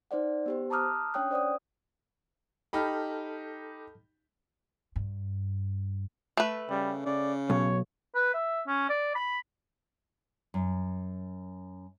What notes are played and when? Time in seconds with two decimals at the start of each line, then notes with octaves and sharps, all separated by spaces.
0.11 D#4 C5 D5 F#5
0.46 B3 G4 C5
0.70 A5 A#5 D6 D#6 F6 F#6
1.14 C#4 D4 C#5 G5 D#6 F#6
1.31 C5 D5 F#5 D#6
2.73 D#4 G4 A4 A5 B5 F6
4.96 G2
6.37 A3 B4
6.70 C#3 G3
7.05 C#3 D5
7.50 B1 C#5
8.15 B4
8.34 E5
8.67 C#4
8.89 D5
9.15 B5
10.54 F#2